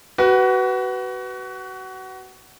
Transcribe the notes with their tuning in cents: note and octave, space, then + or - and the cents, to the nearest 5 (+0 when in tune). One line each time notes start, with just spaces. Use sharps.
F#4 +25 B4 +0